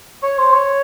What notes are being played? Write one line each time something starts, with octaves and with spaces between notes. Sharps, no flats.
C#5
C5
C#5